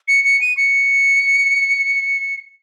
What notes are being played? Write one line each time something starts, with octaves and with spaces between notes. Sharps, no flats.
C#7
C#7
D#7
C#7